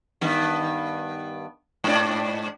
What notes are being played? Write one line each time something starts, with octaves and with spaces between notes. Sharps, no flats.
G2 D#3 B3
G#2 D4 D5